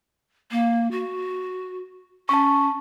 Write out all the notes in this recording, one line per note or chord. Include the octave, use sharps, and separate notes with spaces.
A#3
F#4
C#4 A5 C#6